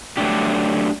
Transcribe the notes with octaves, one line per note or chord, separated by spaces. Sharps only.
F#3 A3 D4 G4